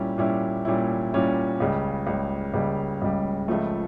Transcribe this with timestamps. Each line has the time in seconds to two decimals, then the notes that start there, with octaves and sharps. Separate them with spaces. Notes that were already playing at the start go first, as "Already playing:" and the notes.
Already playing: A#2 G3 C#4 E4
0.18 A#2 G3 C#4 E4
0.65 A#2 G3 C#4 E4
1.12 A#2 G3 C#4 E4
1.60 C#2 C#3 G3
2.07 C#2 C#3 G3
2.54 C#2 C#3 G3
3.02 C#2 C#3 G3
3.48 C#2 C#3 F3 A3